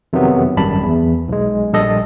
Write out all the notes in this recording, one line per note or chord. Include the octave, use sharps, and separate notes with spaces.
F2 C3 D#3 F#3 B3
G#1 F#2 G3 A5 B5
E2
B1 G#3
A#1 G3 A4 D#5